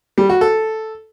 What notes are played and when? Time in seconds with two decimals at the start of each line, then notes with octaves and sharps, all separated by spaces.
0.18 G3
0.29 F#4
0.41 A4